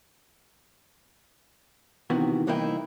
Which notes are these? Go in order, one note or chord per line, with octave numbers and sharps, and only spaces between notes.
C3 D#3 E3 B3 F#4
C2 E3 A#3 D#4 E4 G5